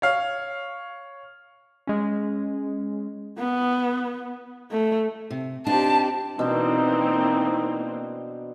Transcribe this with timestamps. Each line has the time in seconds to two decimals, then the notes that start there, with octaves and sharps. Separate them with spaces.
0.02 C#5 F5
1.87 G#3 C#4
3.38 B3
4.71 A3
5.30 C3
5.67 C4 D4 D#4 F4 G4 A5
6.39 B2 E3 A#3 C4 D4 D#4 C5